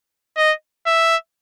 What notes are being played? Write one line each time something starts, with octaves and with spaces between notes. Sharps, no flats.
D#5
E5